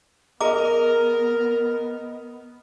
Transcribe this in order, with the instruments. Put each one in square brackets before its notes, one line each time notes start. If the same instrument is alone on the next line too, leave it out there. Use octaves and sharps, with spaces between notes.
[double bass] B3 [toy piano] G#4 A#5 D6 [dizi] A#4 [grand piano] D#5